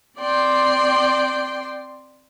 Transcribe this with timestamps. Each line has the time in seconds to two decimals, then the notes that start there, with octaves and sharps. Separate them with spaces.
0.18 C4 D5 G5 C6